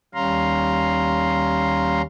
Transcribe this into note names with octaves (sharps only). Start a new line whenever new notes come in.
D#2 G3 C#4 F5 A#5 C6